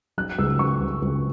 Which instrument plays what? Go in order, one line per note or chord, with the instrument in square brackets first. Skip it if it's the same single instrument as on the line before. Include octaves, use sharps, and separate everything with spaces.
[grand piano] F#3 F#6
C#2 E6
F#3 C#6
C#2
C#2